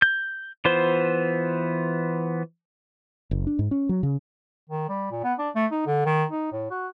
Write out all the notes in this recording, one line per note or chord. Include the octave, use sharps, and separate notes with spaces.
G6
E3 B3 F4 C5
F#1
D4
G#2
C#4
F#3
C#3
D#3
G3
A#2
B3
D4
A3
D#4
D3
D#3
D#4
A2
F#4